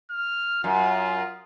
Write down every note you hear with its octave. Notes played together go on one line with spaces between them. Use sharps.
F6
F#2 F4